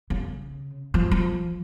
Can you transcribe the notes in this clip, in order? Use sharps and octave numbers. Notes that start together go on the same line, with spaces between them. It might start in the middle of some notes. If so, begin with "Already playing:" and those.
C#3
F3
F3